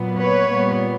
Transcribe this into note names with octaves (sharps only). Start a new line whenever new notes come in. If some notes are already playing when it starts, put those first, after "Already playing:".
Already playing: A#2 F#3 B3
B4 C#5
A#2 G3 B3